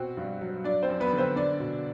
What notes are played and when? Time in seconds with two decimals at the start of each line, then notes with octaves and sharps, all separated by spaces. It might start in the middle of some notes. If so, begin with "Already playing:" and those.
Already playing: B2 C4 F#4
0.17 G2
0.41 F#3
0.64 F#3 D4 D5
0.83 C4 C5
0.89 F#2
1.00 B3 B4
1.13 D3
1.18 C4 C5
1.36 C4 D4 D5
1.60 B2